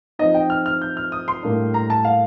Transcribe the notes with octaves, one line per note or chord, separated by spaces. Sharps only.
F3 C4 D#4 D#5
G5
F6
F6
G6
F6
D#6
C6
A2 G3 A#3 D4
A#5
A5
F5